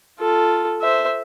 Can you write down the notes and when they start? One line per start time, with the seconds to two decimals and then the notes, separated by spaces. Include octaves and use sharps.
0.20 F4 A4
0.81 C5 E5